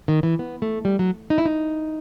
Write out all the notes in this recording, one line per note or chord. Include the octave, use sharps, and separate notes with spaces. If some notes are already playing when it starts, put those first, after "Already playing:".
D#3
E3
B3
A3
G3
F#3
D#4
E4
D#4